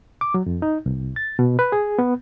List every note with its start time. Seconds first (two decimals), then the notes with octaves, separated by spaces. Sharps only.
0.21 D6
0.34 F#3
0.46 F2
0.62 D#4
0.86 C2
1.16 A6
1.39 B2
1.59 B4
1.72 G#4
1.99 B3